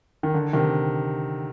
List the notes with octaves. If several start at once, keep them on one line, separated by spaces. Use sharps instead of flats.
D#3
D3
C3 D#3